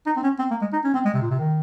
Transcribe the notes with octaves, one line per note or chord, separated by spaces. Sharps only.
D#4
C4
C#4
C4
A#3
G#3
D#4
C#4
C4
G#3
C3
A#2
C3
D#3